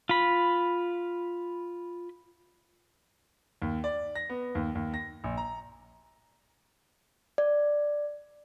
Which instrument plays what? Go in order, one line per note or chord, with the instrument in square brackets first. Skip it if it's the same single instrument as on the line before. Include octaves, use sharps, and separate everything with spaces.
[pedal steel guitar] F4 B5
[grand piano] D#2
D5
A#6
B3
D#2
D#2
A#6
A#1
A#5
[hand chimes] D5